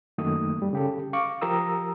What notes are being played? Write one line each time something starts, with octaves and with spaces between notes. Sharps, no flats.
F#2 D#3 A3 A#3 D#6
G2 G3
C#3 G4 A4
F5 C#6 D6
F3 G4 A#4 A#5 D#6 E6